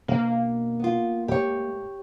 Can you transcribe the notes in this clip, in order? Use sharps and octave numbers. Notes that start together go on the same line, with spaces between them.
B2 A#3 D4
B3 F4
G#2 A3 G4 C#5